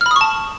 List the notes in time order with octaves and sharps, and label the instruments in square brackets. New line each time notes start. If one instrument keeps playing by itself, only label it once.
[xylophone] F6
B5
D#6
C#6
A5